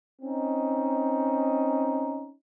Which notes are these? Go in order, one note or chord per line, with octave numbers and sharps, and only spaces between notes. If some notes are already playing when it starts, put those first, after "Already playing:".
C4 C#4 D#4